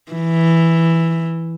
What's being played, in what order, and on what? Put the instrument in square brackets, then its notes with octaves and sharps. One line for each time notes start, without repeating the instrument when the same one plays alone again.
[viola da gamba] E3